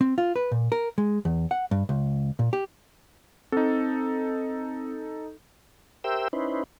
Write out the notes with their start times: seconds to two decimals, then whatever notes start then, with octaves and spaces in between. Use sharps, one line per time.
0.01 C4
0.18 F4
0.36 B4
0.52 A#2
0.72 A#4
0.98 G#3
1.25 E2
1.51 F#5
1.71 G2
1.89 C#2
2.39 A#2
2.53 G4
3.52 C4 D#4 A4
6.04 G4 A#4 C5 E5 G5 E6
6.33 C#4 D#4 E4 B4 C5